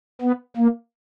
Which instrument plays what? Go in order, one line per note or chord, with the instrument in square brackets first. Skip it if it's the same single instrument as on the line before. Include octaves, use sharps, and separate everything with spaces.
[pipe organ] B3
A#3